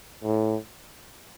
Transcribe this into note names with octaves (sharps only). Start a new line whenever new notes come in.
A2